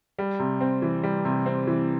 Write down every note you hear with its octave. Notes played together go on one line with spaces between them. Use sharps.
G3
C3
C4
E3
G3
C3
C4
E3